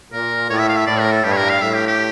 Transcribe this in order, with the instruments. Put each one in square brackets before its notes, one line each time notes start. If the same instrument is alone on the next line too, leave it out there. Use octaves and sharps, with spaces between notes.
[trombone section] A#2 [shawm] A#4
[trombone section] A2 [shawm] C#5
[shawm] E5
F5
E5
[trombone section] A2 [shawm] D5
[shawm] A#4
A4
[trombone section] G2 [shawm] G4
[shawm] C#5
A#4
F5
[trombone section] A2 [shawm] E5
[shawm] G4
G4